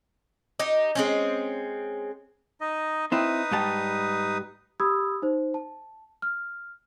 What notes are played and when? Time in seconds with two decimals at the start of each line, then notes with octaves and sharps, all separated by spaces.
0.59 D#4 G4
0.95 G#3 C4 C#4
2.61 D#4 D#5
3.12 C4 D#4 E4 B4 D#6
3.51 G#2 G3 A5
4.80 G4 B5 D#6 E6 G#6
5.22 D#4 C5
5.54 A5
6.22 F6